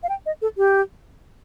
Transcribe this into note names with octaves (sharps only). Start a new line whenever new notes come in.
F5
G5
D#5
A4
G4